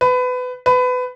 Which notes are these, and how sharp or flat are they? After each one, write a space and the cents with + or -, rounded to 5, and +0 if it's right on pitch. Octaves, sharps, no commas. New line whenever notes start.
B4 +25
B4 +25